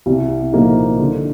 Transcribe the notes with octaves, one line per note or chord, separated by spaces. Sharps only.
C2
A#2 F3 A#3 D#4
D3